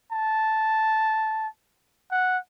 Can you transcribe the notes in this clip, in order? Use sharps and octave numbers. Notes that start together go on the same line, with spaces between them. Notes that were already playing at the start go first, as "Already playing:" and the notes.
A5
F#5